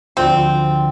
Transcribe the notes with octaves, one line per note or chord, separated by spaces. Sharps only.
D2 D3 F3 C4